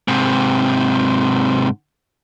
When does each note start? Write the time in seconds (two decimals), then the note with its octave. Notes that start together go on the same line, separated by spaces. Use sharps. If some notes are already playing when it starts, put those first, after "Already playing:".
0.08 G#2 C3